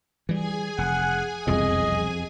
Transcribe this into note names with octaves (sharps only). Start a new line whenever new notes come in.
E3 G3 G#4 G#5
F1 F#5
E1 C2 F2 C3 D#5